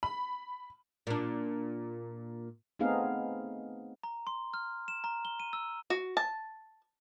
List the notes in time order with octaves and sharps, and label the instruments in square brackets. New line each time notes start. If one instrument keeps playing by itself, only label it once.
[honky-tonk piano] B5
[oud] A#2 D4
[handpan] A3 B3 C4 D#4 G#4 F5
[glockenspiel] A#5
C6
F6
E7
A#5
G7
D#7
E6
[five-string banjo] F#4
A5